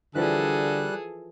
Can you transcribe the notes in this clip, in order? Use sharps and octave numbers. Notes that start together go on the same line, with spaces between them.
D3 E3 F3 G3 G#4 A4 F#6